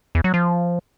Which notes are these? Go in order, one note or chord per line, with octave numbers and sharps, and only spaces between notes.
E2
F#3
F3